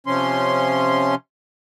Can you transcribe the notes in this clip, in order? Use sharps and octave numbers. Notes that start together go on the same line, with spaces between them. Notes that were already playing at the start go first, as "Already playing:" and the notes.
C3 F3 C#4 C6